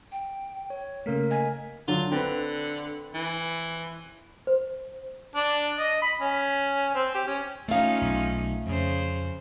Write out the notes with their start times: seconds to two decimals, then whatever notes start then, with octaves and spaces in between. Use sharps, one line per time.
0.12 G5
0.70 C#5
1.06 C#3 A3 A#3 A#4 B6
1.30 D#5 G#5 G#6 B6
1.88 D3 F#3 F4
2.11 D3 C4 B4
3.15 E3
4.47 C5
5.36 D4
5.79 D#5
6.02 B5
6.21 C#4
6.95 C4
7.14 G4
7.27 C#4
7.68 A3 C#4 D#4 F4 F5
8.01 B1
8.66 F2 C#3 C5